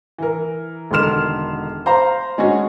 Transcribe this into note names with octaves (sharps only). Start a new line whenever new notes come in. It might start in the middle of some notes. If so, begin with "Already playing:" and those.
E3 A#4
E1 D3 D#3 C6 F6 E7
C5 F5 A#5
G#3 C#4 D4 F#4